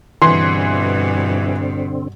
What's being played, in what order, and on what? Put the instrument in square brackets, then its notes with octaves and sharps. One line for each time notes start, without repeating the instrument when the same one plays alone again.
[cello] G2 B2 [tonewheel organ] D3 C4 [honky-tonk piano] E3 [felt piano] C6